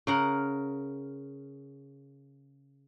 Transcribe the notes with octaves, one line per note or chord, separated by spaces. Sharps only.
C#3 A#4 F#5